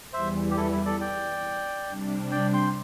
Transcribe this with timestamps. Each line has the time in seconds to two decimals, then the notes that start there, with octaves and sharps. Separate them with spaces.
0.13 E2 E3 G3 C5 E5
0.51 G4
0.57 E4 A4
0.72 E4
0.85 A4 D5
1.00 D5 G5
1.88 C3 G3 D4
2.31 D5 G5
2.54 G5 C6